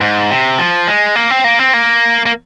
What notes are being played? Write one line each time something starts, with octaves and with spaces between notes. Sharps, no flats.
G#2
C3
F3
G#3
A#3
C4
A#3
C4
A#3
A#3